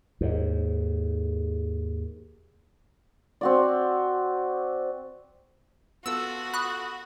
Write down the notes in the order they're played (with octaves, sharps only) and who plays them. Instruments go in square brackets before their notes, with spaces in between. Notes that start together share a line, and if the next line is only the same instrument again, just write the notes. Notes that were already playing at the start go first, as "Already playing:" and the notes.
[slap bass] D#2 G#2
[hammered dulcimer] C4 F#4 D5
[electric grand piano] B3 F4 A4 [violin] F#4 [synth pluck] E6
[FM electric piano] B5 C#6 D#6 [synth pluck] F#6